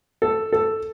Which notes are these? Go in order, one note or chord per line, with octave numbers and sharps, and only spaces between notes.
A4
A4